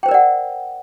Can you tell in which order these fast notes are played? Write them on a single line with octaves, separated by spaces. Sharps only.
G5 C5 A#4 D5 F#5